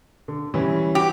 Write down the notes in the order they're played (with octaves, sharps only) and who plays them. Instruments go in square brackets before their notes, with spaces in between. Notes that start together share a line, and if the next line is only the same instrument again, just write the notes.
[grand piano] D3
E3 G3 C#4
[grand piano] F#4 [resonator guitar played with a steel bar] G4